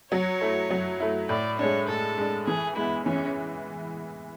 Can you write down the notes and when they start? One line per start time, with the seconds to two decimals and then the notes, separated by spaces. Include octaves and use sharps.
0.12 F#3 C#5
0.41 A3 E4
0.70 F#3
1.00 A3 E4
1.29 A2 D5
1.59 G#3 D4 C#5
1.87 A2 A4
2.18 G#3 D4
2.47 E3 G#4
2.76 G#3 B3 E4
3.06 E3 C#4